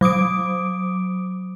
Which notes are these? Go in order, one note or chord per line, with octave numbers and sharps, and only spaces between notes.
F#3 D6 D#6 D7